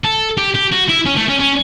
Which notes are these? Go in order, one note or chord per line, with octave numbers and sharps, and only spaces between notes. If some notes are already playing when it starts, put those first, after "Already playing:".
A4
G4
G4
F#4
E4
C#4
A3
C#4
C#4